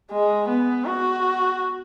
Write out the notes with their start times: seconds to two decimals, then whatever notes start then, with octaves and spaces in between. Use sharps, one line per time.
0.12 G#3
0.48 B3
0.85 F#4